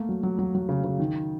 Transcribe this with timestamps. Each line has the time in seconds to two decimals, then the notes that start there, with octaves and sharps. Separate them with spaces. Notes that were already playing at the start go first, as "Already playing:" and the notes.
Already playing: A3 A#3
0.09 F#3
0.23 F#3
0.39 F#3
0.55 F#3
0.69 C#3
0.84 C#3
1.00 D#3